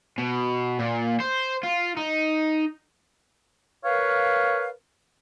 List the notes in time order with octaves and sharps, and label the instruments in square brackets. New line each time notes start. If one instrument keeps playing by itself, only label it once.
[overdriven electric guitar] B2
A#2
C5
F4
D#4
[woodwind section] A#4 B4 C#5 F5